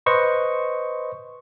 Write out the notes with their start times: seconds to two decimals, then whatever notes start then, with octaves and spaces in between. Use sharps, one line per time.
0.06 B4 C5 D#5 C#6